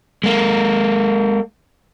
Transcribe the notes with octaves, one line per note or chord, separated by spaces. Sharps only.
G#3 A#3